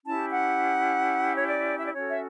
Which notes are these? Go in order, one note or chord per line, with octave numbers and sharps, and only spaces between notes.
C#4 E4 G4 A5
F#5
C#5
D5
E5
D5
C#4 F#4 A4 C#5
E5